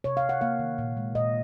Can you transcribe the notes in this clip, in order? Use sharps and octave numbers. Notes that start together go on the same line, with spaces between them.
C3 C#5
F5
C3
F#5
A#3 F5
D#3
A#2
G#3
A#2 D#5